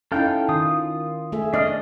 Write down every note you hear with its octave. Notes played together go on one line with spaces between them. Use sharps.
C#4 D#4 E4 A4 F5 G5
D#3 F4 D#6
A3 G#4 E5
D4 D5 D#5 F6